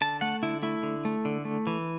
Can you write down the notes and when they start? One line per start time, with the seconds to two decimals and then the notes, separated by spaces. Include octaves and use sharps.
0.01 D3 A5
0.21 A3 F#5
0.43 D3 E4
0.63 A3 E4
0.83 D3
1.05 A3
1.25 D3
1.45 A3
1.67 E3